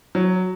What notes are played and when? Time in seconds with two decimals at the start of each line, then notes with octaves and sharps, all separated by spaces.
0.15 F#3